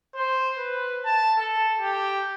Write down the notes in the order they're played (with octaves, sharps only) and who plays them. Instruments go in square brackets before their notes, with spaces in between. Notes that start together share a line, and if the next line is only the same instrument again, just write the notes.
[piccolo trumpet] C5
B4
A5
A4
G4